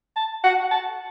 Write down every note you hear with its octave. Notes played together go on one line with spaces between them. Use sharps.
A5
F#5
A5